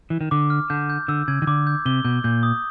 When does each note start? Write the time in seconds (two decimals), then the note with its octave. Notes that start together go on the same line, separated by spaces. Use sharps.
0.10 E3
0.21 D#3
0.31 D3 D6
0.50 F6
0.70 D3 G6
0.90 G6
1.08 D3 E6
1.28 C#3 G#6
1.42 D#3
1.47 D3 D6
1.67 G6
1.86 C3 G7
2.05 B2 G6
2.24 A#2 G6
2.43 D#6